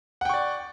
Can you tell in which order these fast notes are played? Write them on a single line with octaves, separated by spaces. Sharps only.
F#5 G5 C#6 D5